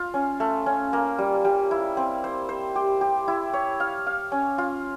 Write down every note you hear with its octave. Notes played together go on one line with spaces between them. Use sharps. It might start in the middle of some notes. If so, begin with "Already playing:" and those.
Already playing: F4
C#4
A3
C#4
A#3
G3
G3
E4
C4
C5
C5
G4
G4
E4
C#5
F5
F5
C#4
F4